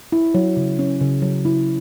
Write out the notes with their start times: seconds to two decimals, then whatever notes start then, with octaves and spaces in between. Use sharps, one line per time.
0.12 E4
0.35 F#3
0.57 C#3
0.79 C#4
1.01 C#3
1.22 F#3
1.45 E4